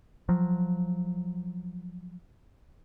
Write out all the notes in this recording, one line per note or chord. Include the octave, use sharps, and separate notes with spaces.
F3 F#3